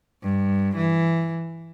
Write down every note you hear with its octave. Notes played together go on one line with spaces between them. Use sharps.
G2
E3